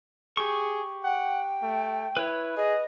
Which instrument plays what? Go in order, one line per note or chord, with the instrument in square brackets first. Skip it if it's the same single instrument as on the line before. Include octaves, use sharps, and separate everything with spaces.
[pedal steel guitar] G4 C#6 [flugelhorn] G#4
[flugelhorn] F#5 [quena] G5
[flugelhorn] A3
[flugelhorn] E4 [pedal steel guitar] B4 C#5
[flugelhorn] G#4 [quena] D#5